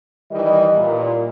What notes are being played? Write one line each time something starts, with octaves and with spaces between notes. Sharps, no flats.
D#3 E3 G3 D#5
A#2